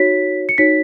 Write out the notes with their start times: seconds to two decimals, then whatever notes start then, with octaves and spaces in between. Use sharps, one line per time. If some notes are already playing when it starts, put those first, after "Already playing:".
Already playing: D#4 F#4 C#5 B6
0.49 C#7
0.58 D#4 F#4 C#5 B6